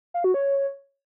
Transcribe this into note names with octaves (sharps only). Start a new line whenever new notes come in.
F5
F#4
C#5